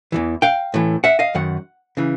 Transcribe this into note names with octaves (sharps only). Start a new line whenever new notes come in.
E2 C#3 E3
F5 G5
A2 E3
E5 F#5
D#5 F5
F#2 D#3 F#5
C#3 E3